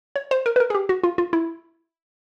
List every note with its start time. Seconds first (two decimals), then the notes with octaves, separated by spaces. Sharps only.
0.16 C#5
0.31 C5
0.46 A#4
0.56 B4
0.60 A#4
0.70 G#4
0.75 G4
0.89 F#4
1.03 F4
1.18 F4
1.33 E4